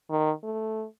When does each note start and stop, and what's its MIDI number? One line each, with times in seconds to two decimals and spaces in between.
0.10 0.31 51
0.44 0.85 57